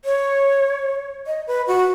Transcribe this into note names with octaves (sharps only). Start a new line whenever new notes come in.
C#5
D#5
B4
F#4